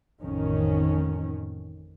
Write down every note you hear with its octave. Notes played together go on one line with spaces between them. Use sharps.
A1 F2 D#3 C#4